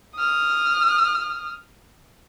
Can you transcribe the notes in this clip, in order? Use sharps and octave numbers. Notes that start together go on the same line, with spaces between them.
D#6 F6